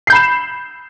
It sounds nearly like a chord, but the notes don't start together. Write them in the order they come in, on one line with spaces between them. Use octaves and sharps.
C7 G6 B5 E7